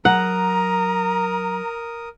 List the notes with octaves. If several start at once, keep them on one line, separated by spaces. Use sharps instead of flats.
F#3 A#4 F#5 A#5 D#6